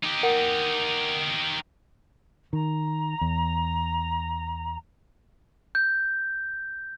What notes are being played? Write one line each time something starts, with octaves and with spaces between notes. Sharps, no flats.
D#4 G4
A#4 F#5
D#3 A#5
E2
G6